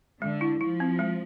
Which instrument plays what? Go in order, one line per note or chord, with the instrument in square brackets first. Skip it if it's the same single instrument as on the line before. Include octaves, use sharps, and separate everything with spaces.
[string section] D3 [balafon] G#3
[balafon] E4
[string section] F3 [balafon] E4
[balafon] C4
G#3